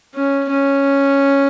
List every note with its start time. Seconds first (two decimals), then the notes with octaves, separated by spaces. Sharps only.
0.15 C#4
0.50 C#4